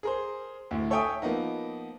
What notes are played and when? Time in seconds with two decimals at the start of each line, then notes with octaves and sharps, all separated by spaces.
0.03 G#4 A#4 C5
0.71 D2 A2
0.90 A4 C#5 E5 G5 G#5 D#6
1.22 F3 A#3 B3 D#4